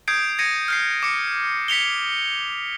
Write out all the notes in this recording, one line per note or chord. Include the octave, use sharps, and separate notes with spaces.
D#6 G6 G#6 C7 D7
G#6 A#6 C#7 D#7
F6 G6 C7
D6 C#7
B6 C#7 F7 G7